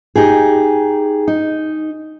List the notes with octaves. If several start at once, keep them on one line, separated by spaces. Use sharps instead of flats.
D#4 G4 G#4
D#4